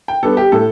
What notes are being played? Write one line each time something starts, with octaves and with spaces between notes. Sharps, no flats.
G5
G3 B3 D4 A4
G4
A2 A4